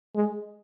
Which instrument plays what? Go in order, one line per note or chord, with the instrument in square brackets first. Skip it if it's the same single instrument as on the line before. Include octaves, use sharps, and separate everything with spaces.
[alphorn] G#3